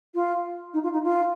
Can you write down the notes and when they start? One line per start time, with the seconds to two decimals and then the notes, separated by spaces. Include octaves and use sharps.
0.14 F4
0.73 D#4
0.83 F4
0.92 D#4
1.03 F4